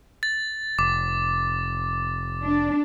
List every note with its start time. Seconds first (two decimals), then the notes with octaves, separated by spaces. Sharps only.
0.23 A6
0.79 F1 D6
2.43 D4